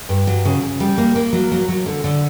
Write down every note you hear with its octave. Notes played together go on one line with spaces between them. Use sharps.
G2
F#3
C#3
C#3
G3
A#3
A#3
F#3
F#3
F#3
D3
D3